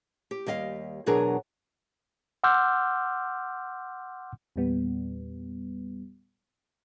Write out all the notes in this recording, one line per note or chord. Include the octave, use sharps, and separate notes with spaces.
G4
D#2 G3 D#5 F5
E2 B2 F#3 D4 G#4 A#4
F#5 C6 D6 E6 F6 G6
E2 A#2 G3 B3